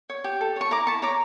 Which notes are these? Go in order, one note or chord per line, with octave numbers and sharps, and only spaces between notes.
C#5
G4
A4
C#5 C#6
E4 A#5 D6
E4 A5 C#6
C#5 A#5 D6